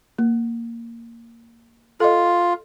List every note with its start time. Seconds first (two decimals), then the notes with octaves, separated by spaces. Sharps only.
0.18 A#3
2.00 F4 A4 D#5